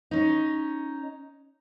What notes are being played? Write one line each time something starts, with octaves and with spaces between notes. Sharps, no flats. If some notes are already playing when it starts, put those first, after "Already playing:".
C#4 D#4